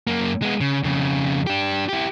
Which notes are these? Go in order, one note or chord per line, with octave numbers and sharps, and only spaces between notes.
F#2 A#3
G#3 B3
C#3
F2 C#3
D4 G4
E4 G4